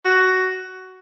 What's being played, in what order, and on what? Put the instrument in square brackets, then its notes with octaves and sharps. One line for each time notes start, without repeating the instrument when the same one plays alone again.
[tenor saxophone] F#4